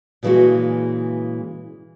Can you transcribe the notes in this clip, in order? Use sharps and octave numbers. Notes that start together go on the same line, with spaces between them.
A#2 C#3 E3 G#3 A3 F#4